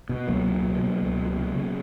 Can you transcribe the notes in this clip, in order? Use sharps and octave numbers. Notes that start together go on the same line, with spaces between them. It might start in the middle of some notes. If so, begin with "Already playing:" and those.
B2
C#2 F#3 A#3
B2
B2
B2
C#2
B2
C#3
C#3